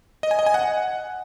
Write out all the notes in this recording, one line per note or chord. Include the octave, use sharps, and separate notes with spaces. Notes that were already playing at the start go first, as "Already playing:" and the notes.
D#5
G#5
D#5
G#5
F#5